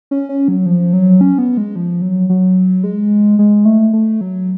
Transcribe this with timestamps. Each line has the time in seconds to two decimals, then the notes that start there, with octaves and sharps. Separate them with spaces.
0.11 C#4
0.29 C#4
0.48 F#3
0.66 F3
0.93 F#3
1.21 C#4
1.38 B3
1.57 G#3
1.76 F3
2.02 F#3
2.29 F#3
2.84 G#3
3.39 G#3
3.65 A3
3.93 A3
4.21 F#3